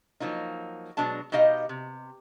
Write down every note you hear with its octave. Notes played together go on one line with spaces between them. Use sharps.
F3 F#3 A#3 D#4
B2 F#3 G#3 D4 A5
B2 D#4 G4 D#5 F5
C3